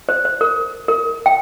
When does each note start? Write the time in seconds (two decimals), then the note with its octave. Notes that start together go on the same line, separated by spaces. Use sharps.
0.09 C5
0.25 C5
0.41 A#4
0.88 A#4
1.26 G5